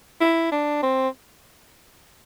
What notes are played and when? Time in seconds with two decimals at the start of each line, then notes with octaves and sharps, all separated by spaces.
0.21 E4
0.52 D4
0.83 C4